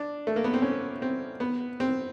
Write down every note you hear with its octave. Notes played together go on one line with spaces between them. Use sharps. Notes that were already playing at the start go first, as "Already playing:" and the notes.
Already playing: D4
A3
A#3
B3
C4
C#4
C4
B3
C4